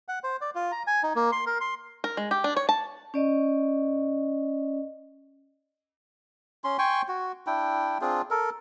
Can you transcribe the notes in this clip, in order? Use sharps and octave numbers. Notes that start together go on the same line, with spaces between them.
F#5
C5
D5
F4
A#5
G#5
D#4
A#3
C6
A#4
C6
A#4
G#3
G4
D4
C#5
A5
C#4 D5 D#5
C#4 C6
G5 G#5 C6 C#6
F#4
D4 E4 G5
C4 D4 F4 G#4
A4 A#4